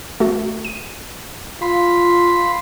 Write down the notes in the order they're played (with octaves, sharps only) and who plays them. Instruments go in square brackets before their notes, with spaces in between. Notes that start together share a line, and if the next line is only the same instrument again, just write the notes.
[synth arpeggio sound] A3 F#4
D#7
[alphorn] F4 [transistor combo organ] B5 C6